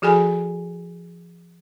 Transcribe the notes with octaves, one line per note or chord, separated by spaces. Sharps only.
F3 F#4 G#4 A4 G#5 B5